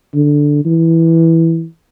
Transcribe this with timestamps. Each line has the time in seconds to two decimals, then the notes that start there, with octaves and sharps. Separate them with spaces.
0.15 D3
0.65 E3